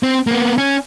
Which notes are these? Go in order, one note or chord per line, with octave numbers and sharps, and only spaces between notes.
C4
A#3 B3
C#4